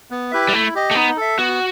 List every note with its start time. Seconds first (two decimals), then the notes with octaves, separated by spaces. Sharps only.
0.11 B3
0.31 E4 G4 B4 E5
0.49 G3
0.53 A3 E4
0.75 G4 D#5
0.91 A3
0.95 B3 D#4
1.17 A4 E5
1.38 B3 F#4